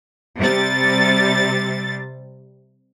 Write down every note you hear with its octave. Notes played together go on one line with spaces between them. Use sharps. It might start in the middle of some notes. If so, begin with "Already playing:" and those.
C3 G3 A6